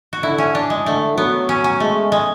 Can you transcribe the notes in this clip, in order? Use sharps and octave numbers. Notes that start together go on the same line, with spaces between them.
F#4
D3 E4
C#4
D4
G#3
D3 A3
F#3 B3
C#4
C#4
G#3 A3
G#3